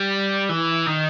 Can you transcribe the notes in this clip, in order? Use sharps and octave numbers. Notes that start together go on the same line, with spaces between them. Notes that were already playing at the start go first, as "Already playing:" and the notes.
Already playing: G3
E3
D#3